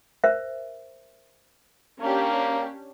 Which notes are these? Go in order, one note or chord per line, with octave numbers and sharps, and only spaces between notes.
A#4 C5 E5
A#3 C#4 D4 G4